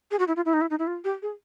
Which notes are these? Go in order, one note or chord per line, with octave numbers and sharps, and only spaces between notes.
G#4
F#4
E4
F4
E4
D#4
E4
D#4
E4
F4
G4
G#4